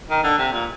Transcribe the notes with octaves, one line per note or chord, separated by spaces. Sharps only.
D#3
D3
C3
A#2